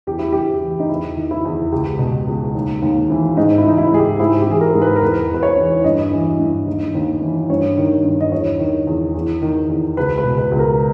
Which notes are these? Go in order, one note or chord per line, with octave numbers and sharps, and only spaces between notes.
E2 G4
E4
E2 G4
E3
D#4
E2 E4
D#3
E4
E2
C#2 G4
B2
C#2
D#2
D#2
E3
G#2 D#4
E4
E3 D#4
E4
G#2 G#4
G4
G#2 E4
G4
E3 G#4
A#4
G#2
B4
A#4
E2 B4
E2 B4
C#5
E3
G2 D#5
E3
G2
D#2
D#2
E3
G2 C#5
D#3
G2
D#5
E2 C#5
D#3
E2
E2
D#3
E2
C#2 B4
B4
B2
B4
C#2
A#4